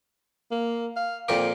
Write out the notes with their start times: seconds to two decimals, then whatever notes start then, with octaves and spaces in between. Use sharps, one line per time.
0.51 A#3
0.97 F5
1.29 F2 A#2 G4 F5